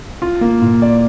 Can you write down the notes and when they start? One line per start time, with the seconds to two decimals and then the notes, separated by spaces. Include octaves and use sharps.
0.22 F4
0.41 A#3
0.62 A#2
0.82 D5